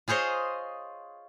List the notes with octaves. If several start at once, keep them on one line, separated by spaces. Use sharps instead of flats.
F4 G#4 C5 C#5 D#5